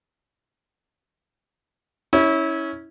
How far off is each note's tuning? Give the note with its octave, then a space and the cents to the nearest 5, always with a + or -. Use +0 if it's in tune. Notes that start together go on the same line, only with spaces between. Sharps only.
C#4 +0 E4 -25